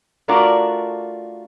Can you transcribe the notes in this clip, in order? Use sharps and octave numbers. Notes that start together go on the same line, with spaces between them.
A3 D4 F4 F#4 A#4 D5